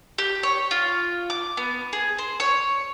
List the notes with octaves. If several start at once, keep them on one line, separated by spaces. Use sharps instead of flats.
G4
C#5
F4
D6
B3
G#4
C5
C#5